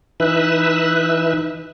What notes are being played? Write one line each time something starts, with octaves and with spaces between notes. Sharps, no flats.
E3 D#4 B4 E5 E6 F#6